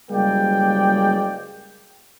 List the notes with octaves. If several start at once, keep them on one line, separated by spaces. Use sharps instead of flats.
F#1 G3 G#3 A#3 D5 G5